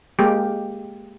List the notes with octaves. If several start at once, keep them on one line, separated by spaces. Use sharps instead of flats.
G#3 A#3 G4